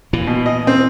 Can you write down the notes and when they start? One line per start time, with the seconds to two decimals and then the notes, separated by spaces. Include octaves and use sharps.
0.13 A#2 E3
0.27 B2
0.46 D#5
0.67 C4